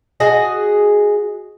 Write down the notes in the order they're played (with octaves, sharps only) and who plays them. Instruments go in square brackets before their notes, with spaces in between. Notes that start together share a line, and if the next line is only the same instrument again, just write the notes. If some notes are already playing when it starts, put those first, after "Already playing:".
[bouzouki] F#4 G#4 D#5